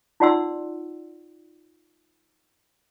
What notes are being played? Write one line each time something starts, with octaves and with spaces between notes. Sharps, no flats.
D#4 F4 D5 F#5 C6 E6